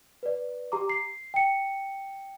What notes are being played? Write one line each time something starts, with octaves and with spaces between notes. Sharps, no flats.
B4 D5
G4 A#5 D6
C7
G5 C#7